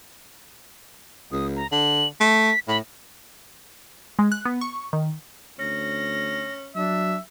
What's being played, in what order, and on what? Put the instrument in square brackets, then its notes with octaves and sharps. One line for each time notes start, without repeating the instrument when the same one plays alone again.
[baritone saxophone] C#2 [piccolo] D#6
[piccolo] A#5
[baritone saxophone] D3 [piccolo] F#7
[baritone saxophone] A3 [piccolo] B6
[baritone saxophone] A2 [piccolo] B5
[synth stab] G#3
F#6
B3
C#6
D#3
[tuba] D2 [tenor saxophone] C#4 [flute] A#6
[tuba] F#3 [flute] D4 [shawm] E5